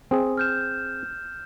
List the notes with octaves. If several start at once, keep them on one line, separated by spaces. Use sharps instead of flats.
C4 G#4
F6 G6 E7